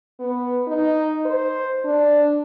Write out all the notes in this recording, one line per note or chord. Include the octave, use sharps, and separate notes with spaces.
B3
D#4
C5
D4